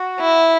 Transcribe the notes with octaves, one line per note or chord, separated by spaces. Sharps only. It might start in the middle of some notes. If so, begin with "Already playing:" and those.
Already playing: F#4
E4